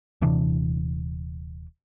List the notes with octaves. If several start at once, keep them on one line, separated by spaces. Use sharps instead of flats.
D#1 C3 E3 D4